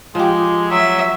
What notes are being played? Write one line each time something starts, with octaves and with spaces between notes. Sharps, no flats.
F3 G#3 G4
F#3 E5